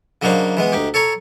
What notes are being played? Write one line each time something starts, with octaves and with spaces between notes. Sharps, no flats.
C#3 F#3 A#3 D4 D#4 C5
E3 G#3 B3
D2 D#4 G4
A4 C#5 A#5 C#6